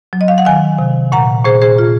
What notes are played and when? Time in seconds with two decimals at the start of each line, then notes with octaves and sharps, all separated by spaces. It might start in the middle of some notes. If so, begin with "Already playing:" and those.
0.13 F#3
0.21 D#5
0.28 F5
0.38 F#5
0.45 D#3 F5 G#5
0.79 C3
1.12 A#2 F#5 A#5
1.45 A#2 G#4 C5
1.62 G#4 C5
1.78 F4